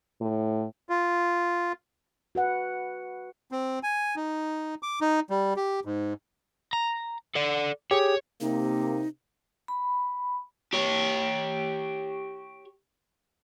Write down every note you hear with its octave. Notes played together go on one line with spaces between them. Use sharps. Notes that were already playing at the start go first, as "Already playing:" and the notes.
A2
F4
F#4 B4 F#5
C4
G#5
D#4
D6
D#4
G3
G4
G#2
A#5
A4 D5
G4 G#4 C#5
C3 A#3 D#4
B5
G4 C#5